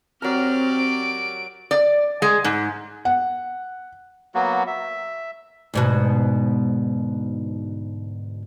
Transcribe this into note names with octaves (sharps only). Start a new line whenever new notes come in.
F#3 C4 G4 A#4 D5 F6
D7
D5
G#3
G#2
F#5
F#3 A#3 B3 F#4
E5
D2 G#2 B2